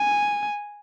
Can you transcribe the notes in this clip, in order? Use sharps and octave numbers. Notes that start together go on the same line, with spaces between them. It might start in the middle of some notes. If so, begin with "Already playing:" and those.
Already playing: G#5